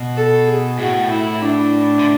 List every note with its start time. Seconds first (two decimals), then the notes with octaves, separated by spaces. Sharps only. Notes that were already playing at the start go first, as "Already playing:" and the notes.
Already playing: B2
0.16 A4
0.47 G#4
0.79 A2 F#4
1.11 E4
1.42 D4
1.99 D3